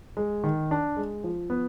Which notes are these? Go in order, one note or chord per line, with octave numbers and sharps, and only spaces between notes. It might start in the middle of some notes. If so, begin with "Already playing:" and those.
G#3
D#3
D4
G#3
F3
B3